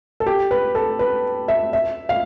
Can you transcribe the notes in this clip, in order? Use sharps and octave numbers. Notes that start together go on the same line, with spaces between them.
A4
G4
B4
A4
B4
E5
E5
F5